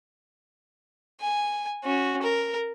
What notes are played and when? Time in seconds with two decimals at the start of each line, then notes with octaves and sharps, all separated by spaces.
1.21 G#5
1.84 C#4 F#4
2.22 A#4